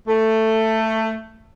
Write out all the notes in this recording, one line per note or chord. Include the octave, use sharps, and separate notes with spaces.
A3